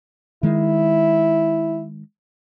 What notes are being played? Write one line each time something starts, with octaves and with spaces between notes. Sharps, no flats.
D#3 G#3 E4